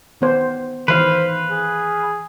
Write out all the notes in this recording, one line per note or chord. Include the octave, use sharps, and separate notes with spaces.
D#3 B3 C5
D#3 E3 B4 C5 F5
G#4